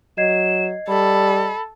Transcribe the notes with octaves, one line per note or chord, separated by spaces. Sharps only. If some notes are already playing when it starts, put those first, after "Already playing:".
F#3 D#5 G#6 C7 E7
G3 A4 B5